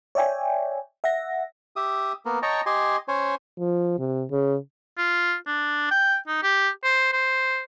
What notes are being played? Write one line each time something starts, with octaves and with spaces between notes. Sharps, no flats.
C#5 D5 E5 G5 G#5
E5 F#5 A#6
G4 E5 D#6
A#3 B3
C#5 D#5 G5 A5 A#5 C#6
G4 D#5 G#5 C6
C#4 C5 C#5 G#5
F3
C3
C#3
F4
D4
G5
D#4
G4
C5
C5